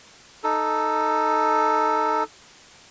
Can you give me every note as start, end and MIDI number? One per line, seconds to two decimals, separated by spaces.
0.44 2.24 63
0.44 2.24 69